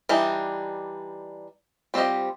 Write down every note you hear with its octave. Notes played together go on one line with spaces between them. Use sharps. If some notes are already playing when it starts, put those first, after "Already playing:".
E3 G3 D4 D#4
G3 C4 F4 G4 D#5